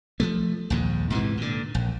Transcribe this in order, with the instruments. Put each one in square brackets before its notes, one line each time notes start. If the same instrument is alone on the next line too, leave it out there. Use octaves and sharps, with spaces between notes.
[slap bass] F3 F#3 A3
A#1 D#2 G#2
G#2 C3 D#3 E3
A#2 D3
A#1